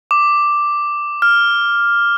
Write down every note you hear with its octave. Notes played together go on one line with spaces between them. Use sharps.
D6
F6